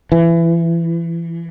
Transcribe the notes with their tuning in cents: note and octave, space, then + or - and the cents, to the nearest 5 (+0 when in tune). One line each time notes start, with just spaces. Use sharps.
E3 +25